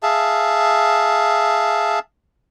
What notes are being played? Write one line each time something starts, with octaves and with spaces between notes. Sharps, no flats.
G#4 E5 F5 A5